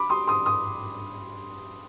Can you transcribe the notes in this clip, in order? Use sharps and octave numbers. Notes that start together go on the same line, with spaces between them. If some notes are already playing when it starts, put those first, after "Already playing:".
Already playing: B5 D6
C6 D#6
C6 D#6
C6 D#6